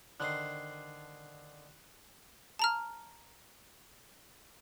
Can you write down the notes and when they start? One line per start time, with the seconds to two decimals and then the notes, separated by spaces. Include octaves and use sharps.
0.20 D3 D#3 C5 F#6 C7
2.59 A5 A#5 F6